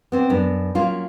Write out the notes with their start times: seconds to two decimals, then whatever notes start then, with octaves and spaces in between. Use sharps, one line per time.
0.12 B3 C4 D4
0.30 F#2 B3 D4
0.75 F#3 A#3 C#4 F4